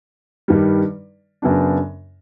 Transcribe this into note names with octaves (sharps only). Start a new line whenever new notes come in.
G2 D#3 G3
F#2 C#3 F#3 B3 D4